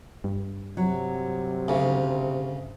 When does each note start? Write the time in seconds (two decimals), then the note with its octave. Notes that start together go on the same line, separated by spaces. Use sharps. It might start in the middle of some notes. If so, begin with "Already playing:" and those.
0.24 G2
0.77 C3 F#3
1.68 D2 C#3